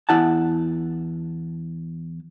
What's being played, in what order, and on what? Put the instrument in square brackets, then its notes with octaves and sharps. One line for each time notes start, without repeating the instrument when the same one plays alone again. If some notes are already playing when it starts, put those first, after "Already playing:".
[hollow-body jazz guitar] E2 E4 F#5 A5